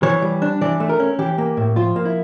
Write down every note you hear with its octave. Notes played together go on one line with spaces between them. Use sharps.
E3 C#5
G3
D4
E3 D5
A3
A#4
C#4
E3 G4
A#3
A2
F3 F4
A#3
E4